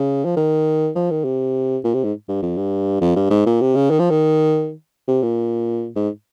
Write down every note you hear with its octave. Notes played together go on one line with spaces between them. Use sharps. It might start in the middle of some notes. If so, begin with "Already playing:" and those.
Already playing: C#3
F3
D#3
F3
D#3
C3
A#2
C3
G#2
G2
F2
G2
F2
G2
G#2
A#2
C3
C#3
D#3
F3
D#3
C3
A#2
G#2